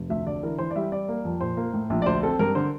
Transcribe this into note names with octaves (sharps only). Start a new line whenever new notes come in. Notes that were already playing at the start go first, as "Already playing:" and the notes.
Already playing: F1
D2 E5
D3 D5
E3 A#4
E3 C5
D5
G3 E5
G3 D5
A#3
F2
A#2 C5
A#3
A2
A#1
D5
D2 C5
C4 A4
G2 A#4
D3 C5